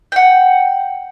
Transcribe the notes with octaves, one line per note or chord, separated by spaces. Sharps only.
F#5 G5